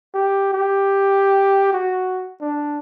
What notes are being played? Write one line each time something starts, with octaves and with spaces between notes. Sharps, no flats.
G4
G4
F#4
D4